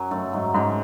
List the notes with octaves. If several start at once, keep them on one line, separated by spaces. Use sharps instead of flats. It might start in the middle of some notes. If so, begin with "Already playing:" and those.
Already playing: F#2 F#3 C#4
F#2 A3
G#2 F#3
G#2 C#4